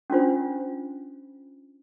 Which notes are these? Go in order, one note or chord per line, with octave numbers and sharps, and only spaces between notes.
C#4 D4 F4 C5